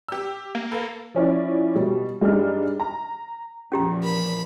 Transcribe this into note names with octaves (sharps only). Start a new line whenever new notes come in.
G4 E6
A#3
A4 B4
F3 C#4 E4 D5
B2 G3
G2 G3 G#3 D4 D#4 F6
A#5
E2 A#2 F3 C#4 G4 A#5
A#4 B5